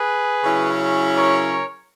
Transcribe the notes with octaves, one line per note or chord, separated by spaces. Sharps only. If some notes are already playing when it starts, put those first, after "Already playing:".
Already playing: G#4 B4
C#3 F#3 C#4 E4
A#4 C#5